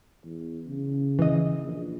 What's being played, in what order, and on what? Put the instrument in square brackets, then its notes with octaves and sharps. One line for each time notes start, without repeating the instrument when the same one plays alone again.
[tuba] E2
C#3
[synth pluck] E3 D#5
[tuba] A#1